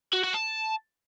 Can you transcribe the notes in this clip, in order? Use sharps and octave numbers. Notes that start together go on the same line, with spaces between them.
F#4
F#4
A5